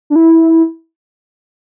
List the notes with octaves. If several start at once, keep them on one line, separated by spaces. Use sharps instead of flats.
D4
E4